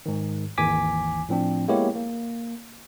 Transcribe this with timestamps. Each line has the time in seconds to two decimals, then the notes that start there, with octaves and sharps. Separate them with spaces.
0.06 G#2 D#3
0.58 G#1 D#2 E3 G#5 D6 B6
1.29 A2 F3 C4 D4
1.68 G#3 A#3 B3 E4 G4 C#5
1.95 A#3